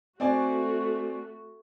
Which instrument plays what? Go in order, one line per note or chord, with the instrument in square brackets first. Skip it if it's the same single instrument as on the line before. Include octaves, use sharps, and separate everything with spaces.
[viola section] A3 F#4 [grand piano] C4 D5 G#5